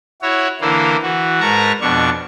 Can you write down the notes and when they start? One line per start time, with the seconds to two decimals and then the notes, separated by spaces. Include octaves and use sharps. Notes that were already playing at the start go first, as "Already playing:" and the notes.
0.22 E4 F#4 C#5
0.61 D3 E3 A#3 E4 C5
1.02 E3 F#4
1.40 G#2 A#4 B4 A5 A#5 C#6
1.81 F2 B2 D4 C#6